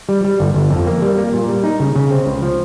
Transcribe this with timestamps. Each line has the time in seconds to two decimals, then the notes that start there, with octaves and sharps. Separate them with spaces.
0.09 G3
0.24 G3
0.40 G1
0.55 G1
0.71 F2
0.87 A#3
1.02 G3
1.18 A#3
1.33 A#2
1.49 G3
1.64 D#4
1.80 C#3
1.95 C#3
2.11 C4
2.26 C#2
2.42 F3